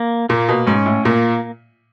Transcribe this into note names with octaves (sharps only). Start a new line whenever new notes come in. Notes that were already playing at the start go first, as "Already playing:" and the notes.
Already playing: A#3
A#2 A#3
B2
G#2 C#4
A2
A#2 A#3